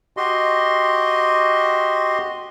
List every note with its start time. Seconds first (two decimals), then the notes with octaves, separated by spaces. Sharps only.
0.17 F#4 G4 D#5 C6